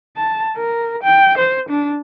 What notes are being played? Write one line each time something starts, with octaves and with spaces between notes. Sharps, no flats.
A5
A#4
G5
C5
D4